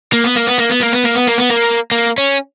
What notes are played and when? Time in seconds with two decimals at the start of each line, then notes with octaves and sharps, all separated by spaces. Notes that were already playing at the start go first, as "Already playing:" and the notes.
0.13 A#3
0.24 B3
0.36 A#3
0.47 B3
0.59 A#3
0.70 B3
0.81 A#3
0.93 B3
1.04 A#3
1.15 B3
1.27 A#3
1.38 B3
1.50 A#3
1.92 A#3
2.18 C#4